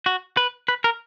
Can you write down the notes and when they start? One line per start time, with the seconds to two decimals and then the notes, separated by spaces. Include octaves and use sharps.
0.06 F#4
0.37 B4
0.68 B4
0.84 A#4